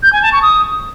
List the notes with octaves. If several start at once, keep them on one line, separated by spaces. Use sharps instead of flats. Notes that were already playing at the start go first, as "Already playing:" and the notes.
G6
G#5
A5
C#6
D#6